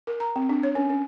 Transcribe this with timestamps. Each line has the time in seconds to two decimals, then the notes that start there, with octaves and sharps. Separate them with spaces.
0.07 A#4
0.20 A#5
0.36 C4
0.49 D4
0.63 C#5
0.75 C#4
0.90 C#4